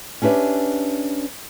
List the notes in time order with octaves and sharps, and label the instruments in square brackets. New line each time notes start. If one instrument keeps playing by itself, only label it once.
[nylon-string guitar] C#4 D4 G4 B4 E5